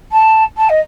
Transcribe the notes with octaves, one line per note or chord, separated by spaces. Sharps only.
A5
A5
D#5